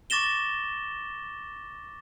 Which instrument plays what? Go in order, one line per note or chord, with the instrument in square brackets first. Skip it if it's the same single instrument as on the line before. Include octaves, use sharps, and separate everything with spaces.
[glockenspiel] C#6 D6 A6 A#6 E7 G7